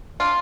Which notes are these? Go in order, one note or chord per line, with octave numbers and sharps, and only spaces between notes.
D4 F4